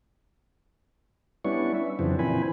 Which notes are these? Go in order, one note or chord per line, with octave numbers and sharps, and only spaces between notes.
G3 B3 C#4 D4 E4 C#6
E5
F2 C#3 E3 F#3 C4 D4
A#2 E3 C4 G#5 B5